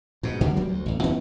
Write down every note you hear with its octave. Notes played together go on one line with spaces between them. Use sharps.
G#2 B2
C#2 D3 F#3 A#3
G#1 F#3 G3 A#3
D2
A1 E2
D2 D#3 B3 C#4